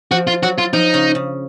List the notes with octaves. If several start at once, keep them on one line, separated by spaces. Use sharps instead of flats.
F3 F#4
F4
F#3 F#4
F4
F3 D#4
C#3
C#3